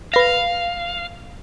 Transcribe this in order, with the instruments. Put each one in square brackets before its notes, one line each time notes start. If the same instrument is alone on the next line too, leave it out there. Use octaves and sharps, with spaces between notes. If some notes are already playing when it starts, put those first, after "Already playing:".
[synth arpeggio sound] B4 A#6 [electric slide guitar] F5